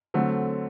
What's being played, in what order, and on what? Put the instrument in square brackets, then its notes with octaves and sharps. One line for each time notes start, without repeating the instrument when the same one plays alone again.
[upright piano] D3 F#3 A3 C4